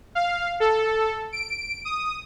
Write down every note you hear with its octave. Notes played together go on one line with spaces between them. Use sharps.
F5
A4
D7
D#6